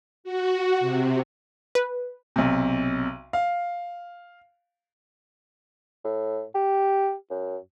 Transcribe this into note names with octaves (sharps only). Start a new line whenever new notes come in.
F#4
C3
B4
B1 C3
F5
A2
G4
F#2